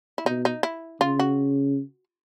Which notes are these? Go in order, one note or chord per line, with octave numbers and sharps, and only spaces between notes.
E4
B2 D#4
D#4
E4
C#3 F4
F#4